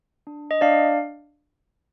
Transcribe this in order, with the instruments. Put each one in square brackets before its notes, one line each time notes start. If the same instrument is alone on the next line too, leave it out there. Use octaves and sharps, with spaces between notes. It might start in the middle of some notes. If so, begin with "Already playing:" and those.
[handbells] D4
D#5
D4 D5 F5